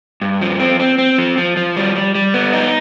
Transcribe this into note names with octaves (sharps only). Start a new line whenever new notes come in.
G2
F3
C4
C4
C4
F3
F3
F3
G3
G3
G3
B3
D#4